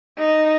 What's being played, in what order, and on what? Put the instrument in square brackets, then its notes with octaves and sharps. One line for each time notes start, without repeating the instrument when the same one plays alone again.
[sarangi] D#4